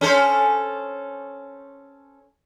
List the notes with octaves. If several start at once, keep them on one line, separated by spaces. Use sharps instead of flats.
C#4 A4 C5